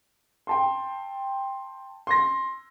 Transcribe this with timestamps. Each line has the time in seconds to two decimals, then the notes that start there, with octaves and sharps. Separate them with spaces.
0.47 G5 A5 C6
2.07 C6 A#6